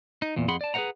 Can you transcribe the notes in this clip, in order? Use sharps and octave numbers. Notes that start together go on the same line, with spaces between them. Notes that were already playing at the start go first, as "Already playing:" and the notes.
D#4
E2 A#2
F2 G#4 F#5 B5 C6
D5 A5
G#4 B4 C5 D#5 F#5 A#5